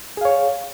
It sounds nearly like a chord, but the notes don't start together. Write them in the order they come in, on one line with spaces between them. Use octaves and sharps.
G#4 F5 C#5